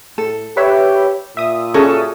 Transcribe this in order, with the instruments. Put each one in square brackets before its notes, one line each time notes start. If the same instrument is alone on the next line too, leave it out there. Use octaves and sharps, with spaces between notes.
[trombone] A2 [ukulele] A4
[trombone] G4 [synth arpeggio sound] B4 C#5 E5
[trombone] A#2 [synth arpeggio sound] E5 D#6
[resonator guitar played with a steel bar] C#4 A4 [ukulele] F#4 G#4 D5